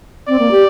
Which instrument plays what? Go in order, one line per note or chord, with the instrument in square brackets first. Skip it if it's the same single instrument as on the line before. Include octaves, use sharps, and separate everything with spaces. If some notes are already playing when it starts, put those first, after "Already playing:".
[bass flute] C4 [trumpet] D5
[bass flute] A#3
G4